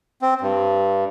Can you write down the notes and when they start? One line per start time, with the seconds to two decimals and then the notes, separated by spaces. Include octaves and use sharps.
0.22 C4
0.41 G2